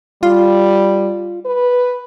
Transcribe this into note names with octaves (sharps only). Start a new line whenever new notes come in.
G3 F4
B4